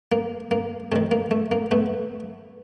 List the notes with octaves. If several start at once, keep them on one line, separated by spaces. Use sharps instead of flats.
A#3
A#3
C3 D#3 A3
A#3
A3
A#3
A3 B3